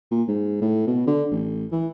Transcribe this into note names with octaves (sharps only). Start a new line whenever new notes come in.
A#2
G#2
A2
B2
D3
A1
E3